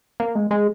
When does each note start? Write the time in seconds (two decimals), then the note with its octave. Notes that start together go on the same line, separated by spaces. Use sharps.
0.20 A#3
0.35 G#3
0.51 G#3